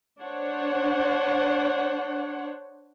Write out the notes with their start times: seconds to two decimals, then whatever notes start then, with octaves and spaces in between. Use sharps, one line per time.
0.21 D4 C5 C#5 F#5